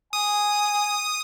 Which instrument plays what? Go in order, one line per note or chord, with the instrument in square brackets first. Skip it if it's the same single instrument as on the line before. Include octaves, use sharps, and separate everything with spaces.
[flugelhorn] G#5 [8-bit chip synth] D#6